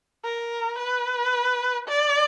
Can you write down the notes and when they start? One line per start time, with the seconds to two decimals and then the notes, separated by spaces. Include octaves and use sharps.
0.24 A#4
0.79 B4
1.88 D5